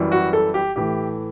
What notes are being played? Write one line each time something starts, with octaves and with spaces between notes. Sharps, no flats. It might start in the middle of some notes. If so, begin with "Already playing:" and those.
Already playing: F#2 E3 G3
F#4
A4
G4
A2 E3 A3 G4